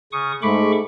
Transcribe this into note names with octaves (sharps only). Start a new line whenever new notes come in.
C#3 C#6 D#6
G#2 G#3 A3 B5 C#6 D6